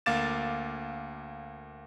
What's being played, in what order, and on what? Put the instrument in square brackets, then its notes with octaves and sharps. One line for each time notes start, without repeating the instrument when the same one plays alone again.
[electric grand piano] D2 A#3 F5 D6 A6 E7